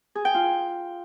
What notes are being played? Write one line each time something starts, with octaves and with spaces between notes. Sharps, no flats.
G#4
G5
F4